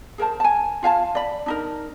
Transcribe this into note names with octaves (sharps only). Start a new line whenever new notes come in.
G#4 A#4 C5 A5
G#5 A5
F4 F5 G#5 A5
D5 B5
D4 D#4 A#4